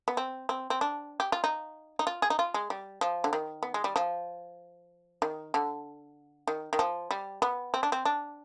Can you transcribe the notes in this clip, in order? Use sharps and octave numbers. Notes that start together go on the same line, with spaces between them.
B3
C4
C4
C4
D4
G4
F4
D#4
D#4
F4
G#4
D#4
F4
G#3
G3
F3
D3
D#3
B3
G#3
G3
F3
D#3
D3
D#3
D#3
F3
G3
B3
C4
D4
C4
D4